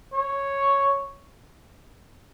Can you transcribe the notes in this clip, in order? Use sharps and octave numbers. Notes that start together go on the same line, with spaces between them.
C#5